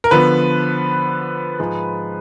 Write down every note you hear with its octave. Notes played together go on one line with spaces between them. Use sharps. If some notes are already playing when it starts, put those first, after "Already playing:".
A#4
D3 F3 B3 B4
G#2 F3 G#3